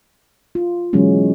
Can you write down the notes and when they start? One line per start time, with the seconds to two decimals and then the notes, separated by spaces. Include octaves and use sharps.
0.55 F4
0.93 B2 E3 F#3 G#3 C#4